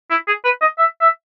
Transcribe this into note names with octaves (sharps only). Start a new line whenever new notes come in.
E4
G#4
B4
D#5
E5
E5